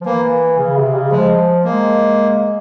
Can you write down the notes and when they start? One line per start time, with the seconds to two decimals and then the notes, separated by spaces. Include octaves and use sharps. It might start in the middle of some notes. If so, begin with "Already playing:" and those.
0.01 F3
0.06 E3 A#3
0.58 C#3
0.76 C3
0.94 C#3
1.11 F3 G#3
1.64 G#3 A#3